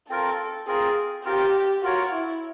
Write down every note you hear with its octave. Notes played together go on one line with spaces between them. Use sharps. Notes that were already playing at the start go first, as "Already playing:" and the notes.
C4 F4 A4 A#4
C4 F4 G#4 A#4
C4 F4 G4 A#4
F4 F#4 A#4 C#5
E4